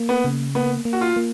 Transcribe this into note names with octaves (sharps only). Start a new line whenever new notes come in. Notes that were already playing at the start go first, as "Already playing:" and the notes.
Already playing: A#3
B3
C#3
A#3 B3
A#3
F#4
F4
A#3